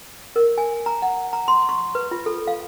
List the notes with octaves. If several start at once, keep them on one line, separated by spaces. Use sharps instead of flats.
A#4
G#5
A#5
F#5
A#5
C6
C#6
B4
F4
A4
F5